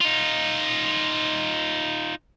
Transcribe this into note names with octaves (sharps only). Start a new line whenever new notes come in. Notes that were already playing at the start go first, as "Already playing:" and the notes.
D#4 F4